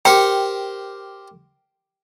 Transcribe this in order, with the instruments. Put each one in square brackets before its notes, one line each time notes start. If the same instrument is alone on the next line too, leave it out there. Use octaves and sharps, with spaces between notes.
[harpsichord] G4 A#4 C5 [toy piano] G5